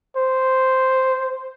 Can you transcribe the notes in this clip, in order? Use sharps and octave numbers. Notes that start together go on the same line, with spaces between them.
C5